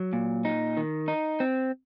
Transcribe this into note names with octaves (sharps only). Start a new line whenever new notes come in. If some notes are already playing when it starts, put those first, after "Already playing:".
Already playing: F#3
A#2
D#4
D#3
D#4
C4